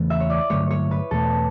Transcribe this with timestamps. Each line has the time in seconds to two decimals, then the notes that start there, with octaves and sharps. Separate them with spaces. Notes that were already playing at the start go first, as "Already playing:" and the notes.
Already playing: E2 C#3 E3 A3
0.10 E5
0.20 C#5
0.30 D5
0.50 G2 D3 F#3 A3 C#5
0.71 C#5
0.91 B4
1.11 E2 B2 A3 A4